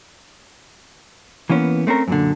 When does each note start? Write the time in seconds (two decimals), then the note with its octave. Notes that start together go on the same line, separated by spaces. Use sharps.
1.49 E3 A#3 B3 C#4
1.87 A3 C4 C#4 A#4
2.08 F#2 A#2 D3